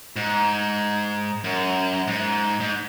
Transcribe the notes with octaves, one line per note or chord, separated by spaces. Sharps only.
G#2
F#2
G#2
G#2